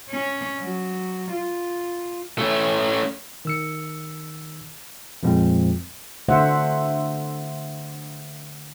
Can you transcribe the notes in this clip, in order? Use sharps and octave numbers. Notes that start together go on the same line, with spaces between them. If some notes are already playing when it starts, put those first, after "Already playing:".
C#4
F#3
F4
A3 C#4
D#3 E6 C#7
F2 A#2 F3 G#3 C4
D3 A3 C5 E5 F#5